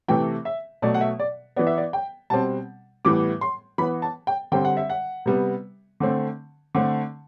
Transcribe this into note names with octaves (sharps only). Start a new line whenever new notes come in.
C3 E3 A3 G5
E5
B2 F#3 A3 D5
F#5
E5
D5
E3 B3 D5
E5
D5
G5
B2 G3 C4 A5
A2 E3 G3 B3 D6
C6
E3 B3 B5
A5
G5
D3 G3 C4 G5
F#5
E5
F#5
C3 G3 B3
D3 A3 C4
D3 A3 C4